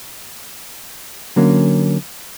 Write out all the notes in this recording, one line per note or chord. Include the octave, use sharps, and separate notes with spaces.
D3 F#3 A#3 C#4